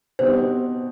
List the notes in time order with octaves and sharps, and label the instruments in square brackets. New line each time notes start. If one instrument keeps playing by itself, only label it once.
[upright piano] B2 G3 C4 D#4 [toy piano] C5